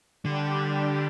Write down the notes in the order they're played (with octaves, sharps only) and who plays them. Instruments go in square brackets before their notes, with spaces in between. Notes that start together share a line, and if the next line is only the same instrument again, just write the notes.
[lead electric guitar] D3 [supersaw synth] G3 D4 G4